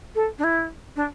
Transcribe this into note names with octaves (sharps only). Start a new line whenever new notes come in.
A4
D4
E4
D4